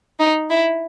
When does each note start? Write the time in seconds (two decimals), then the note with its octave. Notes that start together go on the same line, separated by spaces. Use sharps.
0.19 D#4
0.50 E4